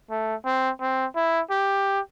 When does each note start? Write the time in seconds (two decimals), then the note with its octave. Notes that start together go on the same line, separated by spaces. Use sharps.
0.11 A3
0.45 C4
0.81 C4
1.16 E4
1.50 G4